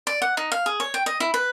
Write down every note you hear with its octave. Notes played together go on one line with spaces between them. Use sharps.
D5
F#5
D#4
F5
G#4
C#5
G5
D#5
E4
B4